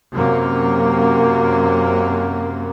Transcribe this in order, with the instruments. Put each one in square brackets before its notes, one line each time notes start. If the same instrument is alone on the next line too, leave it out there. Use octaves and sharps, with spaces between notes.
[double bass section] F#2 C3 A#3